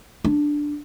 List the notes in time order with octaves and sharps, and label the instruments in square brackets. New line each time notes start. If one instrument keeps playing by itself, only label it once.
[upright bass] D4